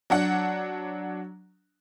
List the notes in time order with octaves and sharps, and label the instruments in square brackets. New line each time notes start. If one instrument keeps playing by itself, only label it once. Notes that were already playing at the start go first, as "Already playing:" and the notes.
[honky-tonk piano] F#3 D4 F#5